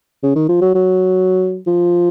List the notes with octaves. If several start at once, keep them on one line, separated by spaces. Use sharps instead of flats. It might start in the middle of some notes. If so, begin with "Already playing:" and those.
C#3
D#3
F3
F#3
F#3
F3